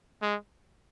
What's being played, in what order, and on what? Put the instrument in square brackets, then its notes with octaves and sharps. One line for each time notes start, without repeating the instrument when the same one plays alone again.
[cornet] G#3